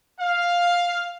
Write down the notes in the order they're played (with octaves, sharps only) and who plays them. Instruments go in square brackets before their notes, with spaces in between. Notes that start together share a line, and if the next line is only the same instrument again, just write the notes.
[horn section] F5